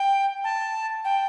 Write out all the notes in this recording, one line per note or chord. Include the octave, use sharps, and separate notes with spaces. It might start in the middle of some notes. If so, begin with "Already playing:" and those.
Already playing: G5
A5
G5